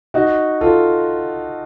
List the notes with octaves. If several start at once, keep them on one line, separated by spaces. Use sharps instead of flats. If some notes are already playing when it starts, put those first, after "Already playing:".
D#4 F#4
F4 A4